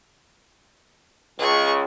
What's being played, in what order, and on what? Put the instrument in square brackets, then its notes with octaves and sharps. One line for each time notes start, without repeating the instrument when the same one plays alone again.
[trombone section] C#2 [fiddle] G#4 C#6